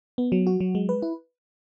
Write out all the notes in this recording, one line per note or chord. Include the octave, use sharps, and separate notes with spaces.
B3
F#3
F#4
F#3
G#3
B4
E4